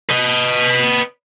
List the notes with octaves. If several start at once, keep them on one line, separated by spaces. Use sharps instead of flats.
B4 D#5